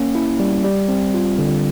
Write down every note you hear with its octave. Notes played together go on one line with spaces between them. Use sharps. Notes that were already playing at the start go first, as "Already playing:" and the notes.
Already playing: A#3 C#4
E4
G3
G3
C4
F4
D3